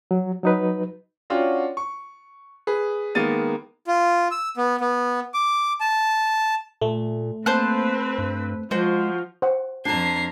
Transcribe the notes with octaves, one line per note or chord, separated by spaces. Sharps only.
F#3
F#3 D#4 B4
C#4 D4 F4 F#4 F#5 G5
C#6
G#4 B4
D#3 G#3 A#3 B3 A6 D#7
F4
E6
B3
B3
D6
A5
A#2 A3
A#3 C4 B4 C5 A5 F#6
G2
F3 G#3 F#4 C5
C5 F#5
F2 D4 A5 A#5 G#6 C7